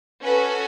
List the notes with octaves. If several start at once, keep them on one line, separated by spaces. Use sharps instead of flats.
C#4 F#4 A4 B4